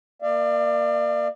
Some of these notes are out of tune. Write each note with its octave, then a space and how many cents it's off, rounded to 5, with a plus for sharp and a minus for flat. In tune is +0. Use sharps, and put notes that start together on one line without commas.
A#3 +0 D5 +30 F5 -35